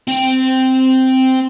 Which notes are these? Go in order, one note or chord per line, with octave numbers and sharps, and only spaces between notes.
C4 G5